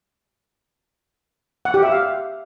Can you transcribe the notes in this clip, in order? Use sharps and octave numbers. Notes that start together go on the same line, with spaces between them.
F#5
G4
E5
F5